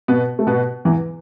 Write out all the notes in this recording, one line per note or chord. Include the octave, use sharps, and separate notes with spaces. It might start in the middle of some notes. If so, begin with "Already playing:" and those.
B2 B3
A3
B2 B3
E2 E3